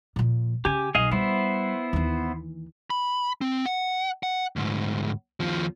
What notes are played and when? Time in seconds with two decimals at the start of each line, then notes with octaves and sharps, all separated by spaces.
0.16 A#2 F3
0.65 C#3 G4 G#5
0.95 B1 G#4 D#5 F5
1.11 G3 B3 E4 C5
1.93 D#2 E3
2.90 B5
3.41 C4
3.66 F#5
4.23 F#5
4.56 D2 G#2
5.40 D#2 F3